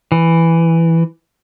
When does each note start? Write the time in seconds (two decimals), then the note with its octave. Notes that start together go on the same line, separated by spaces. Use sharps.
0.12 E3